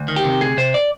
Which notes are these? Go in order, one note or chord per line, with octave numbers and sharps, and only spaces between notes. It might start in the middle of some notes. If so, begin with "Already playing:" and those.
Already playing: D2
D#3
G4
C3
D2 G#4
C3 C5
D5